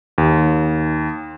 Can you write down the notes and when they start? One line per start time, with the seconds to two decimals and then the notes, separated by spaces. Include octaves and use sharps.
0.18 D#2